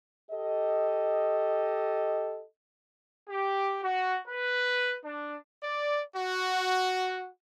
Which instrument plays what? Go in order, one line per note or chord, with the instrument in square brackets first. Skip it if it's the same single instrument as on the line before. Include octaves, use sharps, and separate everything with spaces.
[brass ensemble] G4 A4 D#5
[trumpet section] G4
F#4
B4
D4
D5
F#4